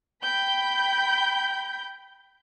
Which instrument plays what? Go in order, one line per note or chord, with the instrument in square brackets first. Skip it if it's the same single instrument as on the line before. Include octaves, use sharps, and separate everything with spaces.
[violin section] G5 B5 G6